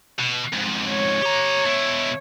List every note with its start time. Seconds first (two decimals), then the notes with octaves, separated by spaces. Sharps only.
0.19 B2
0.53 F2 G#2
0.89 C#5
1.22 G4 A#5
1.66 B2 E4